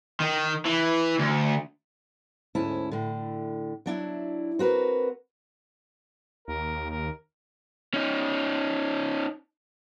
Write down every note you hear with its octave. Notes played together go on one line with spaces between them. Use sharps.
D#3
E3
D2
D2 G#2 C#4 E4 A5
A2 D3
F#3 D4 E4
C4 F#4 A#4 B4
D#2 A#4
A#4
C#4 D#4